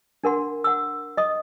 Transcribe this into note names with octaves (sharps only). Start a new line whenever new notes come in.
D4 A#4 F#5 C6
F#5 E6
D#5 D#6